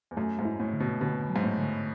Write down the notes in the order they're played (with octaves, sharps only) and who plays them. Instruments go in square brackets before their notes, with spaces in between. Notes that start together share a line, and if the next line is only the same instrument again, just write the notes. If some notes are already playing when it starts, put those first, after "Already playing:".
[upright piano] E2
[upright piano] F#2 [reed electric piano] A3
[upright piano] G#2
[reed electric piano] E4
[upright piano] A2
[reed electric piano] D3
[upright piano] B2
[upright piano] B2 [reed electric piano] D3
[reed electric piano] F#3
[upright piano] G#2
A2
[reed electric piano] D3